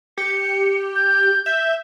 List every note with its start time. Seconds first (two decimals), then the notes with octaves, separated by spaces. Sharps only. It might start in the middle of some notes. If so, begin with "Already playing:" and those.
0.18 G4 C#7
0.95 G6
1.46 E5 G6